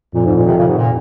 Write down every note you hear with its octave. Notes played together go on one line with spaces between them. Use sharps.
F2 A#2
G#2
A#2
C3 D#3
A#2 C#3
G#2 C3
A#2